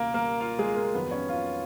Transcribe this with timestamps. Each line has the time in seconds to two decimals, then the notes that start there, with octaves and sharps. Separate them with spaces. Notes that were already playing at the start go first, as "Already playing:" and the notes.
Already playing: C#2 B2 A#3 A#4
0.14 A#3 A#4
0.40 F4 F5
0.59 G#3 G#4
0.76 A#3 A#4
0.94 F2 D#3 F#3 B3 B4
1.11 C#4 C#5
1.29 F4 F5